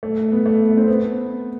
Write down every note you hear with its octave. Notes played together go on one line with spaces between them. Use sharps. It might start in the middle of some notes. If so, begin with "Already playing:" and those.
A3
B3
A3
B3
C4
B3